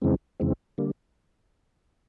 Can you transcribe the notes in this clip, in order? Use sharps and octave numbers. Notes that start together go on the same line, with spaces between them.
F2 C#3 E3 G#3 C4
F2 C#3 E3 G#3 C4
D3 G3 A#3